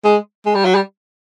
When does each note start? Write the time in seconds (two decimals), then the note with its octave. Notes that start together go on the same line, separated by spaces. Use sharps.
0.05 G#3
0.46 G#3
0.55 G3
0.65 F#3
0.75 G3